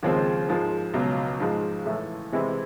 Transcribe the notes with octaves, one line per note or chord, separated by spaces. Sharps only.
D#2 C#3 F3 G#3 C4
G#2 F3 G#3
C#2 B2 F#3
G#2 F3 G#3
A2 E3 A3
C3 E3 G#3 C4 E4